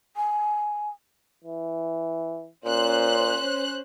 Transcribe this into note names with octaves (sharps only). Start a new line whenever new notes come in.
G#5
E3
A#2 C#4 C5 F#6